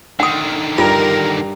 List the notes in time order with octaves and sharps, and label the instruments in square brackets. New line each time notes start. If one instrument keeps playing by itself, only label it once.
[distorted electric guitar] D3 D#3 [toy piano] F#5 D#6
[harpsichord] G2 [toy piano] F4 [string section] A#4